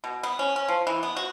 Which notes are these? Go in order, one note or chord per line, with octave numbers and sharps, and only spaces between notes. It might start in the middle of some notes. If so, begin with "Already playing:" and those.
B2
B3
C#4
C#4
F3
E3
B3
F#4